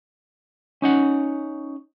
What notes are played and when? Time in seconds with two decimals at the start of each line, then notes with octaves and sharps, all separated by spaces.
0.82 C#4 D#4 F#5